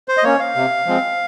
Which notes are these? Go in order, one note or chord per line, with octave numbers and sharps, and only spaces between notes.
C5
D#5
A#3 C#4 C#5
F5
C3
F3 G#3 C4